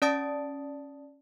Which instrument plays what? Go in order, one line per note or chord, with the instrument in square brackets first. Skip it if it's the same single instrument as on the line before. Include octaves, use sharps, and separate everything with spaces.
[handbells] C#4 D5 A5 D#6 A6 D7